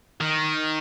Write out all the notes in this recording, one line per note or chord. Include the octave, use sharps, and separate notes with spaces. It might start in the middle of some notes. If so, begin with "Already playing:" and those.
D#3